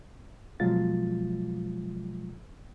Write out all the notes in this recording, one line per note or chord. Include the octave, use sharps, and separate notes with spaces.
B2 F3 F#3 G#3 F4 A6